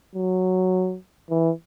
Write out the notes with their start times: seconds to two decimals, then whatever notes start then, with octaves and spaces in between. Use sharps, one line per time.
0.15 F#3
1.30 E3